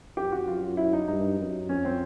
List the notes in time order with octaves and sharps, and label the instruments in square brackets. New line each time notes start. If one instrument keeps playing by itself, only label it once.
[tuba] F2 [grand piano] G4
[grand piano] F#4
[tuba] F#2 [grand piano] F4
[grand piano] E4
D#4
[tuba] G2 [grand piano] D#4
[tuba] F#2
[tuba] F2 [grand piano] C#4
[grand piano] C4